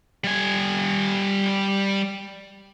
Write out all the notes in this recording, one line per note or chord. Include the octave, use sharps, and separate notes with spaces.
G3 G#5